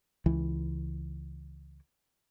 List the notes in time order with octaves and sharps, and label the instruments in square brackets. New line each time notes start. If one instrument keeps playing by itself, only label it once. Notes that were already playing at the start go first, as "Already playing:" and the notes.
[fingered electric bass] C#2 E3